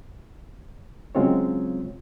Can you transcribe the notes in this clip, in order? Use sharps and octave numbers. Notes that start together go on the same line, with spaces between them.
C#3 F#3 G#3 C4 F4 C#5